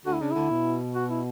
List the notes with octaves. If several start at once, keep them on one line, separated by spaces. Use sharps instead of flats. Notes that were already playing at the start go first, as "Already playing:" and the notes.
D2 D3 F#4
E4
C#3 D4
D2 D3 E4
B2
F#4
E4